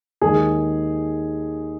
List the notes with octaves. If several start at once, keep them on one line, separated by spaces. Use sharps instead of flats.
D#2 D#3 G#3 D#4 G#4